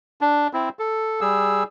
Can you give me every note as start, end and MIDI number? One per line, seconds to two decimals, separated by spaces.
0.21 0.48 62
0.53 0.69 60
0.53 0.69 64
0.79 1.21 69
1.21 1.63 55
1.21 1.63 68
1.21 1.63 88